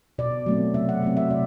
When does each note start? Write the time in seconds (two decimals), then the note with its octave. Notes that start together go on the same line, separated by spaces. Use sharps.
0.18 B2 D5
0.46 F#3 A3 C4
0.74 C3 E5
0.89 F#5
1.02 F#3 A3 C4
1.17 E5
1.30 C3 D5